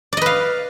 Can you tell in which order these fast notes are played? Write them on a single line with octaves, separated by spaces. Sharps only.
D5 D#5 B4 F5